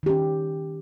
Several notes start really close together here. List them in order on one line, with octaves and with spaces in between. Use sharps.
D#3 G4 C#4